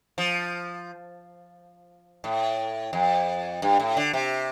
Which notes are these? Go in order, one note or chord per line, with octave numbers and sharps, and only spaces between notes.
F3
A2
F2
G2
A2
D3
C3